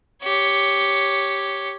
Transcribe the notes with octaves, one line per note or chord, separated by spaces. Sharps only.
G4 C#5